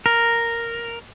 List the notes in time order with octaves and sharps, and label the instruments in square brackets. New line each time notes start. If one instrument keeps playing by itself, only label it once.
[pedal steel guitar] A#4